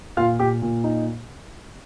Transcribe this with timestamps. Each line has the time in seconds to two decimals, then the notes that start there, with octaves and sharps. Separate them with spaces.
0.17 A#2 F4 F5
0.40 A#2 G4
0.62 A#2
0.84 D#4